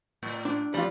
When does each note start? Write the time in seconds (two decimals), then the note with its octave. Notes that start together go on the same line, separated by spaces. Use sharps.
0.23 A2
0.45 D4
0.74 E2 F3 G3 F4 D5